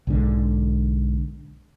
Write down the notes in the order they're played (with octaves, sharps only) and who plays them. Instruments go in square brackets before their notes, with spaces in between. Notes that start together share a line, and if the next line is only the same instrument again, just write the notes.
[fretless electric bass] B1 G#2 D3